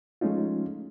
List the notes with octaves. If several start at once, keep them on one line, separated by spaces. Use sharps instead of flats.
F3 G#3 A3 C#4 D#4 F4